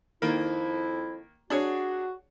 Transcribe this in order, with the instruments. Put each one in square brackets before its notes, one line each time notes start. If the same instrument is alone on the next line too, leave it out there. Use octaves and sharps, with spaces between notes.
[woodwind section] F2 E4 [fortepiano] D#3 A#3
[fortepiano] D4 G#4 C#5 [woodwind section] F#4